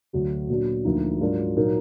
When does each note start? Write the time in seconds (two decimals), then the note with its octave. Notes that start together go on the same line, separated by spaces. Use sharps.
0.13 D2 D3 F#3 D4 F#4
0.49 A#2 F#3 B3 D4 F#4
0.85 D2 D3 F3 A#3 D#4
1.21 G#2 F#3 D4 F4 A#4
1.57 A#2 F#3 A#3 D#4 A#4